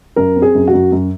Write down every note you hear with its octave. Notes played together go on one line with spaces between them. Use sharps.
F#2 A#4
C4
G#4
F#2
F#4
F#2
F#2